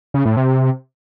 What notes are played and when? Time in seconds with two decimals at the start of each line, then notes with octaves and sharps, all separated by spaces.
0.14 C#3
0.25 A2
0.37 C3